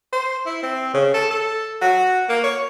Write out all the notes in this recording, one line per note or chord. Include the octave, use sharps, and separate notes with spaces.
C5
E4
C4
C#3
A4
A4
F#4
A#3
C#5